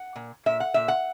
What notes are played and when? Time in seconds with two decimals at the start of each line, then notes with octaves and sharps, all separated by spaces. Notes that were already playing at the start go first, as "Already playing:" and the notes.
Already playing: F#5
0.16 A#2
0.46 A#2 E5
0.60 F#5
0.74 A#2 E5
0.88 F#5